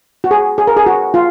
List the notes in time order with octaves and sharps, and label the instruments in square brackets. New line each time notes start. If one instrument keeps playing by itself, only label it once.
[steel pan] F#4
G#4
G#4
A#4
G#4
F#4
F4